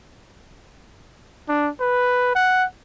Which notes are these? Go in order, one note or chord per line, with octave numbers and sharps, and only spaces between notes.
D4
B4
F#5